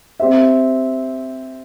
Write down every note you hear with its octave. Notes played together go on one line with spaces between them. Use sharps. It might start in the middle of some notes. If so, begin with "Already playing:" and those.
C4 G4 C5 E5